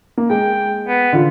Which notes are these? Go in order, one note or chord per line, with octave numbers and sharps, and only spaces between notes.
A#3
G#3 G5
B3
D3 F4